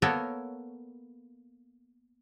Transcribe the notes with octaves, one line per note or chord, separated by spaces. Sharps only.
A#3 B3 A4 A#4 C#5